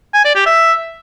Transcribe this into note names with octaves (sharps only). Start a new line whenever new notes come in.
G#5
D5
G4
E5